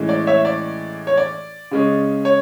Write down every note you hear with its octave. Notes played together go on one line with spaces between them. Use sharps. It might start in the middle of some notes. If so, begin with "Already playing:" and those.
Already playing: A2 E3 G#3 C#4
D5
C#5 E5
D5
C#5
D5
C#3 G#3 C#4
C#5